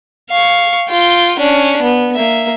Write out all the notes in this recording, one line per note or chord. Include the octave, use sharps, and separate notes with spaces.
F5 C#6
F4 G5
C#4 D4
B3
A#3 E5